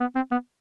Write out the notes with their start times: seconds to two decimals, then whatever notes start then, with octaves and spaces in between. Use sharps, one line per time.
0.01 B3
0.16 C4
0.32 B3